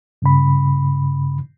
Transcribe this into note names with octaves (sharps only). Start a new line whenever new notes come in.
G2 C#3 B5